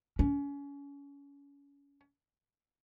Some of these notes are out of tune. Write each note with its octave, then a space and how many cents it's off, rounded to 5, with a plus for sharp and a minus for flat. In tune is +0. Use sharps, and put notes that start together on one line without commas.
C#4 +30